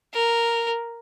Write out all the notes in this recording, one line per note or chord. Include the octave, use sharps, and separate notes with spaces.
A#4